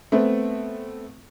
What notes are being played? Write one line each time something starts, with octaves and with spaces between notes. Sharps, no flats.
A3 B3 C4